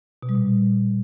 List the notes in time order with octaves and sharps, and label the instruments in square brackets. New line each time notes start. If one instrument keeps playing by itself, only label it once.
[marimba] B2
G3
A#2